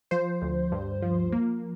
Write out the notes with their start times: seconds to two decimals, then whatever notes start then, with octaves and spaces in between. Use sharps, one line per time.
0.11 F3 C5
0.42 D2
0.72 G2
1.02 F3
1.32 A#3